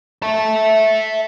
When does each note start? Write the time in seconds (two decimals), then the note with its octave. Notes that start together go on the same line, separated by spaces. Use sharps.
0.23 E5 A5